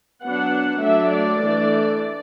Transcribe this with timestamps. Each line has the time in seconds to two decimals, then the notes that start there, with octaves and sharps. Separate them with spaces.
0.24 F#3 B3 D4 F#5
0.83 F#3 A3 D4 E5
1.12 D5
1.42 E3 A3 D4